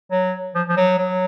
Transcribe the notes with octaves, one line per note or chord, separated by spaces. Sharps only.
F#3
F3
F3
F#3
F#3